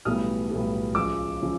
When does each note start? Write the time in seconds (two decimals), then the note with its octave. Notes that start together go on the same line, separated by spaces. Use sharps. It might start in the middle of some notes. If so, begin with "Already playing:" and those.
0.05 B1 A2 E3 G3 B3 D#6 F6
0.50 B1 A2 E3 G3 B3
0.95 C#2 C#3 F3 G#3 D6 E6
1.42 C#3 F3